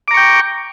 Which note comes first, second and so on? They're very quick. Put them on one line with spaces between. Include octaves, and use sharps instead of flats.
D6 A#5 C#6 G5